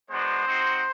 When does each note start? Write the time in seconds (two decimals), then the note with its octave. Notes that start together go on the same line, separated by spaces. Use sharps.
0.10 G#3 B3 D4 F#4 C5
0.47 C4 D#4 F#4